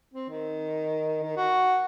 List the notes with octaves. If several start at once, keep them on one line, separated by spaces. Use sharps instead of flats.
C4
D#3
D#3
F#4